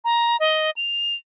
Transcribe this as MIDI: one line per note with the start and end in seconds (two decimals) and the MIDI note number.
0.04 0.37 82
0.40 0.70 75
0.76 1.13 101